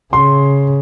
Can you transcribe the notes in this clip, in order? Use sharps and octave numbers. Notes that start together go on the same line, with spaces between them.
C#3 C6